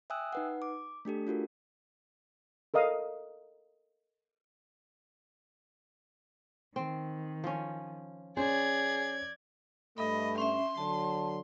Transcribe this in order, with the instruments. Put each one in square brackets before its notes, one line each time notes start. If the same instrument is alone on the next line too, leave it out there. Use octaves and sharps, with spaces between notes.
[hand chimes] E5 G5 G#5 D#6 E6 F#6
D#4 B4 F#5
D6
A3 D4 G4 A4
D4 F4 F#4 A#4
[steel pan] A4 A#4 D#5 F5 D#6
[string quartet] D#3 [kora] C4
[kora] F3 C#4
[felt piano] C#4 [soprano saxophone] G#4 [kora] C5 [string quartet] D5 G#6
[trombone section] G2 A3 [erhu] D#5 [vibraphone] B5
[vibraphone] C#4 E5 [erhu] C6
[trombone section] D3 F#3 [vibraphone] A5